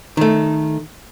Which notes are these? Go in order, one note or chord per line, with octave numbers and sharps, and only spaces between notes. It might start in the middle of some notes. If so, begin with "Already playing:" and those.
D#3 A3